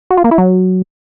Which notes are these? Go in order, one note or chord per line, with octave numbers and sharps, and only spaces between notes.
F#4
F4
A#3
E4
F#3